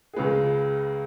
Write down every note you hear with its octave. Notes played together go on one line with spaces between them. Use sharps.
G#4
C#2 C#3 G#3 B4